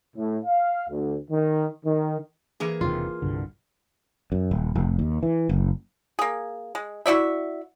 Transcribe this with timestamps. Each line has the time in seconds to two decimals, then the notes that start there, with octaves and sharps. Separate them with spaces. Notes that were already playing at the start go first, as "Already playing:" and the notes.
0.17 A2
0.45 F5
0.89 D2
1.30 D#3
1.85 D#3
2.60 E3 A#3 G#4
2.81 E1 C3 D#3 F4
3.22 C2 G2 D3
4.32 F#2
4.51 D#1
4.75 F1
4.99 D#2
5.23 E3
5.49 F#1
6.19 A#3 G#4
6.75 G#3
7.06 E4 F#4 D5 E5